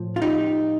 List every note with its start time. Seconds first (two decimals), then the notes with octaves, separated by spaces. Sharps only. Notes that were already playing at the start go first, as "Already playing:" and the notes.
Already playing: A2 F3
0.16 F4
0.22 D#4 G4